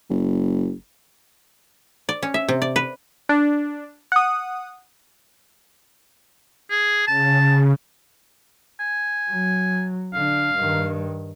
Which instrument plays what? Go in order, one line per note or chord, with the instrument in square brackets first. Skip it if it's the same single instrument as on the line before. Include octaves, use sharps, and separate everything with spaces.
[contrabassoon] F#1
[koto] D5
C#4
E5
C3
D5
B4
[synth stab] D4
F#5 D#6
[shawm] G#4
[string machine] C#3 [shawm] A5
[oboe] G#5
[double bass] F#3
[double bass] D3 D4 [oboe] F5
[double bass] G2 D#3